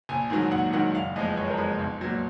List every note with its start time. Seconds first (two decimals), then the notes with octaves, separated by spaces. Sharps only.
0.09 A#1 G#5
0.30 G#2 D#3 F#3
0.51 A#1 F#5
0.73 G#2 D#3 F#3 F#5
0.94 F#1 F5
1.16 F2 F3 G#3 D#5
1.31 B4
1.37 F#1 C#5
1.50 A#4
1.57 F2 F3 G#3 B4
1.79 B1
2.01 A#2 F#3